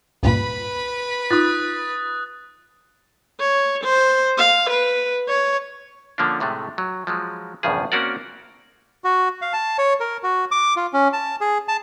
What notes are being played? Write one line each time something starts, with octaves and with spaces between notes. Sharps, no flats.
C#2 G2 A#2 B4 B5
D#4 F4 D#6 F#6 A6
C#5
C5
F5
B4
C#5
D3 F3 A#3 C#4 D4
A2 C3 G#3 A3
F#3
F3 F#3 G#3
A#1 E2 G2 C#3 F3 G#4
A#3 C4 C#4 F#4 A#4 D5
F#4
F5
A5
C#5
A#4
F#4
D6
F4
C#4
A5
G#4
A5